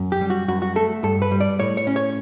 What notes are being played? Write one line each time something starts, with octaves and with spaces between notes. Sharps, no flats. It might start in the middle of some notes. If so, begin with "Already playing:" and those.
Already playing: F#2
G4
G3
F#4
F#2 F#4
F#4
A3 A4
G2 A4
B4
G3
D5
A2 C#5
C#5
C#4
C#5